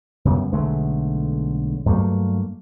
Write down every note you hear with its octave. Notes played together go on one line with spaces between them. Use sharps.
F#2 C#3 G3 B3
B1 D3 G#3 A3
G2 F#3 A3 A#3